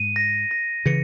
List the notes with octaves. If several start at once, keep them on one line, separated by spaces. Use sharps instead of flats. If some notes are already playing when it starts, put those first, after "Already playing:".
Already playing: G#2 D#7
A#6
A#6
C#3 E3 C#7